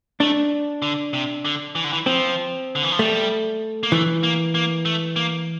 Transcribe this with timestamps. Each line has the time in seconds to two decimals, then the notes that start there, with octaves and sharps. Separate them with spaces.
0.20 A3 D4
0.82 D3
1.13 C3
1.45 D3
1.75 E3
1.84 D3
1.93 E3
2.06 F3 C4
2.75 D3
2.83 E3
2.92 F3
2.99 G3 A3
3.83 A#3
3.92 E3 A3
4.23 A#3
4.55 A#3
4.85 A3
5.16 A#3